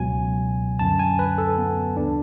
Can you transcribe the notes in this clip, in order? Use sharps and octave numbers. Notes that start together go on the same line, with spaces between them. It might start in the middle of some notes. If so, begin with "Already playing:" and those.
Already playing: C#2 B2 F#3 G#5
F#2 D3 F#3 A5
G#5
B4
A4
B3
D2 C#3 E3 D4